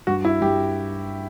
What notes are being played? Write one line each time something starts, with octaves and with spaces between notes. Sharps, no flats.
G2 F#4
E4
G2 G4